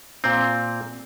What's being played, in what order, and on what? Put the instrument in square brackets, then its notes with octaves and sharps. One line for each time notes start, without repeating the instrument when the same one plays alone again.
[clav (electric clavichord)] A#2 C4